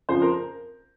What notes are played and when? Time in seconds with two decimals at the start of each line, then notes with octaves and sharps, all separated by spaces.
0.09 F2 C#3 F3 C5
0.22 A#4